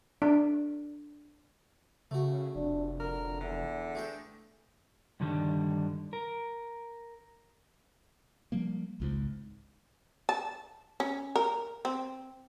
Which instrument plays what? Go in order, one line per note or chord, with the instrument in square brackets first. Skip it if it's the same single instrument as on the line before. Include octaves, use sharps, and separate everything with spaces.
[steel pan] D4
[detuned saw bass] C#3 [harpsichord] A3 F#4
[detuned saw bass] F1 [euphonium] D4
[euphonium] D3 [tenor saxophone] A#4
[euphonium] E2 [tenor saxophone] D3
[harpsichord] A3 G#4 G5
[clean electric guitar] G2 D3 D#3 G3
A#4
[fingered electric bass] F3 G3 A#3
G#1 C#2 G#2
[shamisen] A5
C#4
A#4
C4